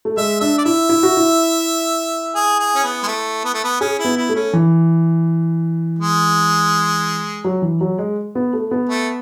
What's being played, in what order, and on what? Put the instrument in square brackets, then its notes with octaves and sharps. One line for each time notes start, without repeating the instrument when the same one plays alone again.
[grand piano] A3
[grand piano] G#3 [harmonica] E5
[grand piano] D4 [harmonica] E5
[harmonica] D5
[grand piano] E4 [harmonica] E5
[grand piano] E4
F#4
E4
[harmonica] G#4
G#4
C#4
B3
G#3
A3
B3
A3
B3
[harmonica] C#4 [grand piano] G#4
[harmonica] E4
[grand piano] B3
[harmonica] E4
[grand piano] A3
[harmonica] C#4
[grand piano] E3
[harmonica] G#3
[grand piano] F#3
E3
F#3
G#3
B3
A3
B3
[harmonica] A3